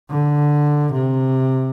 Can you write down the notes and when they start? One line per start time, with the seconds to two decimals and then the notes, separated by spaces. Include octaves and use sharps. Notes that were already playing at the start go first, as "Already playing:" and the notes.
0.10 D3
0.93 C3